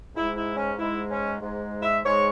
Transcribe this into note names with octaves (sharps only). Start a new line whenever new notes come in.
G#2 G#3 E4
E4
C#4
G#2 G#3 E4
C#4
G#2 G#3
E5
G#2 G#3 C#5